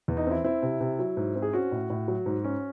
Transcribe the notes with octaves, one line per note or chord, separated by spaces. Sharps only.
E2
D#4
C4 E4
C4 E4
C3
C3
F#3
G#2
C4
G#4
C#4 F#4
A2
A2
F#3
G#2
C#4